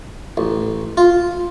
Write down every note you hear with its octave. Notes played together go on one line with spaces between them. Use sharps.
A1
F4